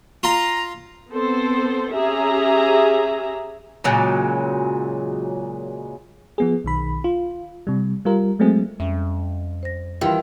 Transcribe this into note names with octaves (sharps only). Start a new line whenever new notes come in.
F4 A#5 C6
B3 C4 A4 C5
C#4 G4 G#4 E5 A#5
A#2 C#3 F#3 G#3
F3 B3 G#4
B1 D#3 B5
F4
C3 G3
G3 F4 A#4
F#3 G#3 A3 C4 G#4
F2 G3 C#4 E5
C5 A#6
D#3 E3 G3 E4 F4 B4 C6